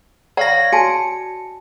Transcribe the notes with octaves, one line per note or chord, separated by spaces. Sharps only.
C#5 D5 F5 F#5 A#5 A#6
F#4 G#5 A5 C#7